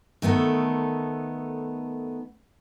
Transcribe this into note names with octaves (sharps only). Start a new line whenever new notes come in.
D#3 A3 B3 A4